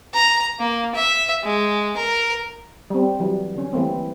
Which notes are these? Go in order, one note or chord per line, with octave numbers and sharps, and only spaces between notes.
A#5
A#3
E5
G#3
A#4
G3 C4
E3 F#3 G3
D3 C#4
E3 G3 A3 A#3 C4